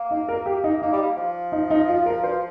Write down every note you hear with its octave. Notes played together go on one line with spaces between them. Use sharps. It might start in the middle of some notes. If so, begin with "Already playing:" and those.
Already playing: A#3
D#4
A#4
G4
D#4
A#3 D#4
G3
A#3
F3
D#4
D#4
F4
A#4
C5